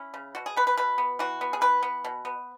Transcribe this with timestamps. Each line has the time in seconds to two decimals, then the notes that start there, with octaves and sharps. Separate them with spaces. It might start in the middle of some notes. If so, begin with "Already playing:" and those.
Already playing: C#4 E4
0.14 C#3
0.35 B2 F#4
0.46 G#4
0.56 B3 B4
0.67 B4
0.77 B2 B4
0.98 B3
1.19 E3 F#4
1.41 B3
1.53 G#4
1.61 E3 B4
1.83 B3
2.05 B2
2.25 B3